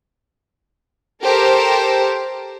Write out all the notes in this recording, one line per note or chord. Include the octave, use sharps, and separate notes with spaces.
G4 A4 A#4 C5